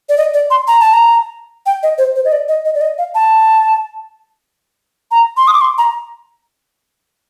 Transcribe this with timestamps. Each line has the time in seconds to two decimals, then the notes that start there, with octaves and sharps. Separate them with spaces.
0.09 D5
0.18 D#5
0.34 D5
0.50 C6
0.67 A#5
0.80 A5
0.93 A#5
1.66 G5
1.83 D#5
1.98 C5
2.15 C5
2.25 D#5
2.32 D5
2.48 D#5
2.65 D#5
2.75 D5
2.81 D#5
2.98 F5
3.15 A5
5.11 A#5
5.37 C6
5.47 D#6
5.53 D6
5.61 C6
5.78 A#5